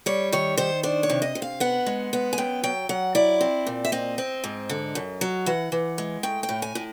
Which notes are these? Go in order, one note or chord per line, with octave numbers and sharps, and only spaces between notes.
G3 C#5
D#3 C#5
D#3 C5
D4 C5
C#5
C3
D#5
C3
F5
B3 F#5
G#3
B3
G#5
F#2 G5
F#3 G5
F#3 F#5
E4 D5
C4
A#2
E5
C4 D#5
C4
G#2
D3
F#2
F#3
E3 F#5
E3
G#3
A3 G5
G5
A2
G#5
A2